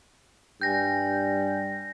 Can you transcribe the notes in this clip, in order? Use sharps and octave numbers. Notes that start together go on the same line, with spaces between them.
G2 G3 G5 G#5 G6 A#6